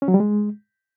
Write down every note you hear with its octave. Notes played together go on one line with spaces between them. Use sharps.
C#4
F#3
G3
G#3